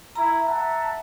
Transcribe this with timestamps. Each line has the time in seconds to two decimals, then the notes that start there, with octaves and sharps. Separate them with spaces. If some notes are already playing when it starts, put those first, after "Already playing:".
0.15 E4 A#5
0.47 E5 F#5 A5